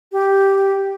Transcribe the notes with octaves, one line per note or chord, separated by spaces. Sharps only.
G4